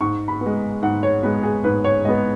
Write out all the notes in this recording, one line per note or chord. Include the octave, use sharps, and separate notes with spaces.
G#2 C#6
B5
B3
G#3
G#2 F#5
C#5
G#3 B3 B4
G#4
G#2 B4
C#5
G#3 B3 D#5